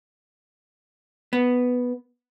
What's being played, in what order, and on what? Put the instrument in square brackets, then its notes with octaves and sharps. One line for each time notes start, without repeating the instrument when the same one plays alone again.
[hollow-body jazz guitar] B3